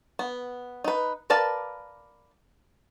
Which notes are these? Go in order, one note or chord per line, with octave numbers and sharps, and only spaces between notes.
B3
D#4 B4
A#4 B4 D5 F5 A5